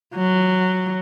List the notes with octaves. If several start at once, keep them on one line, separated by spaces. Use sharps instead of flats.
F#3